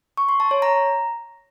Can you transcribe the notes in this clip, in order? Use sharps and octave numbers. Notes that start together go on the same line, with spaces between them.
C#6
C6
A5
C#5
A#5